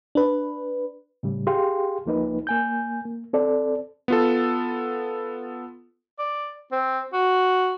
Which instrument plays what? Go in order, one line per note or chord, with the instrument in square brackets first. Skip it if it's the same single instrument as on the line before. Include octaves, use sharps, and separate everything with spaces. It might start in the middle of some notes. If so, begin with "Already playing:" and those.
[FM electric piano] D4 B4
[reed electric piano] A2 C#3 G3
G4 G#4 F5 G5 C6
C#2 F3 A#3 D#4 B4
A#3 G#5 G6
A#3
C4 A4 D5
[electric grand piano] B3 F4 A4
[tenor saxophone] D5
C4
F#4